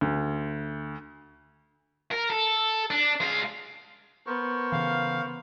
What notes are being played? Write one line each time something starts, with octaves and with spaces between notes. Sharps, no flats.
D2
A#4
A4
D4
G#3 F5
B3 A#4 C5 C#6
C#3 E3 F5